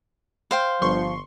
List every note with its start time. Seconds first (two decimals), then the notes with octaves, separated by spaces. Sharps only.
0.51 C5 F5 G5
0.82 G1 F3 C6 C#6